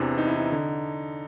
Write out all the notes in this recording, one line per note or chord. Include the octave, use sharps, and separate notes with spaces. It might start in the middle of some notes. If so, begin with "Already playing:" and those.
Already playing: E2 C3 E3 D4
D#4
E4
D#4
D3